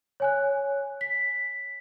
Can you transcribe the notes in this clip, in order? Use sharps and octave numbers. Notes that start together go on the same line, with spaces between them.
C#5 G#5 F#6
B6